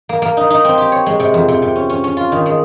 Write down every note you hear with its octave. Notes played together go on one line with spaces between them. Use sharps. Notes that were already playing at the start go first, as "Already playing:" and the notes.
A#3
A#3
D#4
D#4
C4
G4
C#5
G#3
C3
F2
C3
C3
C#4
C#4
C#4
F4
D#3
G#3